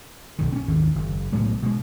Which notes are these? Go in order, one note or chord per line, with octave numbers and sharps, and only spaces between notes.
B1 F#2 D#3
C4 C#4
G#1 D#2
F#1
B1 A2 F#3 G#3
B2 G#3